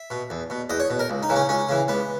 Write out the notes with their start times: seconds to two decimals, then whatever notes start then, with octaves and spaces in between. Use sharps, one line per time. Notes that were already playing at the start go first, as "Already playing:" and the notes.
Already playing: E5
0.10 B2
0.30 E2
0.50 B2
0.70 E2 D#5
0.80 C#5
0.90 B2
0.99 A#4
1.10 C#2
1.23 D#4
1.29 C#3 E3
1.36 C#4
1.49 C#2 C#4
1.69 C#3 E3
1.88 C#2 B3